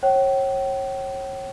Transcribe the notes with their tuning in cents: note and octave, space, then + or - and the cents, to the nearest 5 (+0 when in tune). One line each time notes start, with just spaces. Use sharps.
C#5 -30 G5 -40